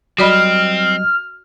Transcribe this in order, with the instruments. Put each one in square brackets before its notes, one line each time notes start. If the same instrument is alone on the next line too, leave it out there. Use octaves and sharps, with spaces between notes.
[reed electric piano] F#3 G3 D#5 [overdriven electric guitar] C4 [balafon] F#4 D5 B5 [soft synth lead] F6